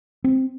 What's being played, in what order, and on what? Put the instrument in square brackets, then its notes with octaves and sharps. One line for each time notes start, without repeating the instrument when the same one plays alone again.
[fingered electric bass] C4